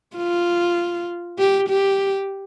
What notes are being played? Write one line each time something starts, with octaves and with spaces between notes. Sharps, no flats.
F4
G4
G4